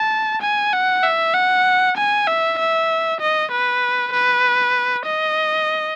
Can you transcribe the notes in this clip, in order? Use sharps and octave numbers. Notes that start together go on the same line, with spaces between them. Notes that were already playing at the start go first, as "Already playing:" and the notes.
Already playing: A5
G#5
F#5
E5
F#5
G#5
E5
E5
D#5
B4
B4
D#5